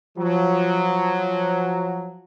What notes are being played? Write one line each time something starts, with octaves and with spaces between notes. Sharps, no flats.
F3 F#3